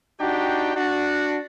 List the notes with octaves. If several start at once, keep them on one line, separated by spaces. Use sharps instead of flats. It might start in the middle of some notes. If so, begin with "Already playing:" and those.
D4 D#4 F#4 G4 G5
D4 F#4